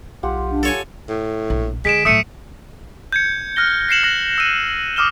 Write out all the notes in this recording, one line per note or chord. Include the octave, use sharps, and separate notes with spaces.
B1 F4 G4 F#5
D4
A4 C#5 G#5
A2
A#1
D3 G#3 B6 D7 E7
A2 F#3 A3 D#6 C#7 D#7
G6 G#6 C#7
F6 F#6 A#6 G7
A#6 C7 C#7 E7 F#7
F6 F#6 A#6 F#7
E6 D#7
D6 D#6 F6 E7 G7